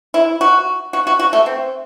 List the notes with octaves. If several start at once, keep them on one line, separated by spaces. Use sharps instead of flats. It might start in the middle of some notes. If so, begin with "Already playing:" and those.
E4
F#4
F#4
F#4
F#4
A3
C4